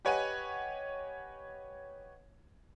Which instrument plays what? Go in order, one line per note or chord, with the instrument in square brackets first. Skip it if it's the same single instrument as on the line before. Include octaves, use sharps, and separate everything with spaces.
[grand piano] G4 B4 C#5 D#5 F#5 G#5